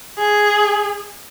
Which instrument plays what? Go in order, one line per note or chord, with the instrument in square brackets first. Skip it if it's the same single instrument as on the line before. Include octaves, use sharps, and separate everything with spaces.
[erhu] G#4